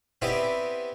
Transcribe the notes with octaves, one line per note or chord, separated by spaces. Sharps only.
B3 C4 E4 G4 D5 D#5